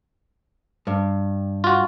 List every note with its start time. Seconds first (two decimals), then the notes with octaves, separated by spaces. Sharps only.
0.87 G2
1.64 F4 F#4